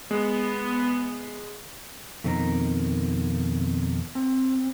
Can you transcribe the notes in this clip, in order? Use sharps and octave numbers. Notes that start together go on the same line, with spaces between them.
G#3 B3
F2 B2 D#3 C4 A#5
C4